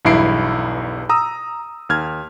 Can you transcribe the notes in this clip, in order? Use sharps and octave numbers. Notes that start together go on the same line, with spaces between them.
B1 E2 G2 E4 C7 D7
A#5 D#6 E6
D#2 F6 G#6